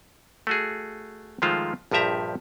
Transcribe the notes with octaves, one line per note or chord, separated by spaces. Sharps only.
A3 F#4 G#4
D#3 F3 G#3 A3 F4 C5
A#1 G2 F3 G4 E5 A#5